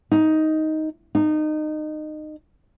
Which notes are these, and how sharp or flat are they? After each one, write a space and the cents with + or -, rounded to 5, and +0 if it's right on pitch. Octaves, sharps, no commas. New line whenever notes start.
D#4 +10
D#4 -25